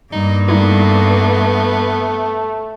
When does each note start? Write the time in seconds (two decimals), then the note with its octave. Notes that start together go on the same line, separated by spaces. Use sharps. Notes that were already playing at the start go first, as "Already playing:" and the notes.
0.12 G2 A#3 D#4
0.48 G3 A3 B3 D#4 E4